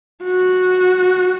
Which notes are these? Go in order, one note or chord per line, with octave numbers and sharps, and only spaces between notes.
F#4